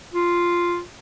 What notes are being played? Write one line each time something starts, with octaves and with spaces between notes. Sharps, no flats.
F4